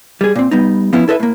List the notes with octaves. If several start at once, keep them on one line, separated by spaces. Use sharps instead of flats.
G3 G#4
A#2 C4
G3 B3 D#4
F3 B3 C#4 E4
E4 A4 B4 D#5 E5
A2 A#3